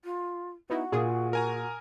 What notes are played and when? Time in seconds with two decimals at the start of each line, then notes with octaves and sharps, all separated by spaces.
0.04 F4
0.70 B3 D#4 E4 F#4
0.92 A#2 F4 G#4 D#6
1.33 A#4 G#5 A#5